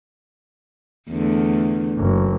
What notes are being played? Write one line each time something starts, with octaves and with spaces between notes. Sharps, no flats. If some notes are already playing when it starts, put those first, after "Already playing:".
E2 D3 A3
F#1